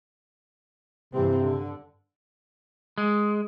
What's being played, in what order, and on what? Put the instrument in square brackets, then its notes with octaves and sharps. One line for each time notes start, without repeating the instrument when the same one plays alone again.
[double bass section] G2 E3 C4 [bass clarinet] C3
[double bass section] D3
[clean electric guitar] G#3